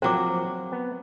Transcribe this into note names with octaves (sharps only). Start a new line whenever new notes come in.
F3 F#3 A#3 C4 C5 D6
B3